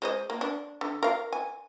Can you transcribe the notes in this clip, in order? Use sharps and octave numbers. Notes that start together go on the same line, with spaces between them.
G#3 C5 D#5
A#3
D4
D3
A#4 F5
G#5